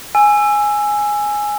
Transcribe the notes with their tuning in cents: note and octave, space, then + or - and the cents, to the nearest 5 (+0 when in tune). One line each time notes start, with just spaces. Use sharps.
G#5 +0 E6 +15